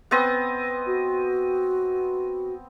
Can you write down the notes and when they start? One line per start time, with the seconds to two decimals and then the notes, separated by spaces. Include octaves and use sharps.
0.11 B3 C4 D#5
0.87 F#4